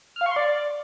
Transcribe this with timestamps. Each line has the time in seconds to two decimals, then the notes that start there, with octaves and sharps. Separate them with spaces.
0.16 F6
0.21 F5
0.26 C#6
0.31 C6
0.36 D5